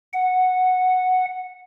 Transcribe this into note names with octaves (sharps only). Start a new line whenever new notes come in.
F#5